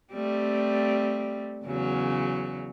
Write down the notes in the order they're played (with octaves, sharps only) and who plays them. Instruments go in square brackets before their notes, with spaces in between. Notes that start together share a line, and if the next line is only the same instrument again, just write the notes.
[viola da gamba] G3 A3 C4
E2 C#3 F#3